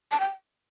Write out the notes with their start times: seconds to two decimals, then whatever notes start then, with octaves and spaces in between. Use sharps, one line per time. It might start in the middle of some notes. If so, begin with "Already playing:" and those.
0.11 A5
0.20 G5